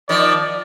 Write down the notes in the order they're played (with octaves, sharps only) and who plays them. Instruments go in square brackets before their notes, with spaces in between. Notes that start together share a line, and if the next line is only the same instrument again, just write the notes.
[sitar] D#3 F3 [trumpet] D5